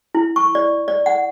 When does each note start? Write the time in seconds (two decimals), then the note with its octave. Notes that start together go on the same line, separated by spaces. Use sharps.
0.15 E4
0.36 C#6
0.55 D5
0.88 D5
1.06 F#5